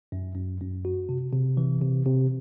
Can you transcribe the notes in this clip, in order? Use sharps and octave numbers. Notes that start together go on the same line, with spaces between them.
F#2
F#2
F#2
F#4
C3
C3
E3
C3
C3